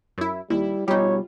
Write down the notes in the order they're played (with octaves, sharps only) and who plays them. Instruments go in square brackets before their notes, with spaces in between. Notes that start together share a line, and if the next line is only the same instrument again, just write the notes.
[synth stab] F#2 E4
[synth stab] D#2 [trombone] G3 [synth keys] E4
[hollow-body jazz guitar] B2 G3 [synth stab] D#4 G4 [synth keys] F4 [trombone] C#5